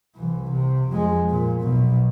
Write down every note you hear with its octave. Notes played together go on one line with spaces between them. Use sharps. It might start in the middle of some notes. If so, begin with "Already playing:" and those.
C2 E3
C3
F2 G#3
A#2
B1 B2